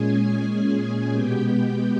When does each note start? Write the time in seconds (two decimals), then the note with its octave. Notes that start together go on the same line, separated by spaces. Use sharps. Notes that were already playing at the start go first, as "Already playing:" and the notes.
Already playing: A#2 G#3 C#4 G#4 G#5
0.48 G#4 G#5
1.12 B2 G#3 B3 G4 G5